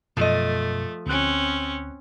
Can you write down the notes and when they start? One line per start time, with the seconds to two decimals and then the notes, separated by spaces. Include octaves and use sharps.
0.17 F#2 B2 F3 A3 D#5
1.06 D2 C4 C#4 F#6